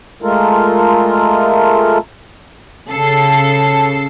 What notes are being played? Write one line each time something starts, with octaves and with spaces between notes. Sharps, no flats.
G#3 A3 F4 A4 A#4
C#3 A4 C7